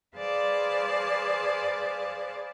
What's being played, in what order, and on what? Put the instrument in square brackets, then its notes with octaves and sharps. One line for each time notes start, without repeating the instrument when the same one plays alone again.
[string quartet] G#4 B4 C5 D5 F5 A5